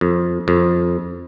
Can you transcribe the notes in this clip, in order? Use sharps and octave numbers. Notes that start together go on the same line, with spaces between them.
F2
F2